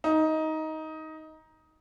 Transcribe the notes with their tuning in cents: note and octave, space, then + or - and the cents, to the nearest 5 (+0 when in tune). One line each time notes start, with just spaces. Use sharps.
D#4 +15